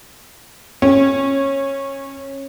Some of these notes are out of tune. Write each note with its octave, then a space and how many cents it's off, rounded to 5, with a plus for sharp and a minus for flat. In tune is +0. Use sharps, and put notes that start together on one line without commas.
C#4 -20